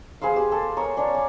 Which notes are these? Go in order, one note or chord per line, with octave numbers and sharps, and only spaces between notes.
G#4 B4 C5 F5
G4
G#4 A4
A#4 C#5 D#6
C#4 D4 C#5
D5